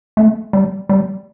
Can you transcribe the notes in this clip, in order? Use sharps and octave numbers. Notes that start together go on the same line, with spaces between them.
A3
G3
G3